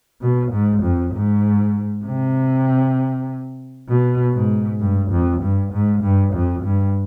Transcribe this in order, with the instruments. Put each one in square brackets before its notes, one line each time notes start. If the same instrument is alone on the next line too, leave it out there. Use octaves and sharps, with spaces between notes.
[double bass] B2
G#2
F2
G#2
C3
B2
G#2
G2
F2
G2
G#2
G2
F2
G2